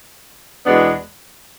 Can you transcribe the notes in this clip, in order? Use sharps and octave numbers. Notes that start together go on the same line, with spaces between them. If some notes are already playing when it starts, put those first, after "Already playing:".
E2 B2 G#3 B3 D4